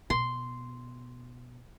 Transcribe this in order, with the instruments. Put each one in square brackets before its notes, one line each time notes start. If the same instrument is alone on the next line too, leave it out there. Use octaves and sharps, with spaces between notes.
[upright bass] B2 [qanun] C6